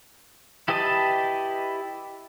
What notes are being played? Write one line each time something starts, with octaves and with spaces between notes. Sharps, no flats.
E4 G4 B4 D#5 A5